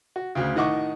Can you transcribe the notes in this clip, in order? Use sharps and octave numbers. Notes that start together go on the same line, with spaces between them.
F#4
D2 C#3
A2 D#3 D#5 F#5 C#6 D6